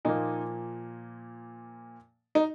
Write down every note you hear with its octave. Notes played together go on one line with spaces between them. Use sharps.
A#2 F3 A#3 D#4
D#4